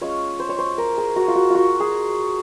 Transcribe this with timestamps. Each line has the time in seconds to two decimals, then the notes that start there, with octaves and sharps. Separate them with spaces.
0.01 G#3 C#4 F4 C#5
0.40 C5
0.49 C#5
0.58 C5
0.78 A#4
0.98 G#4
1.16 F#4
1.28 F4
1.35 F#4
1.50 F4 F#4
1.80 G#4